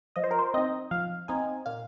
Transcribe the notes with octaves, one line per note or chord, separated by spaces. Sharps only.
F3 D#5
C5
A#4
C5
C4 D#4 D#5
F3 F5
C4 D#4 G#5
A#2 F5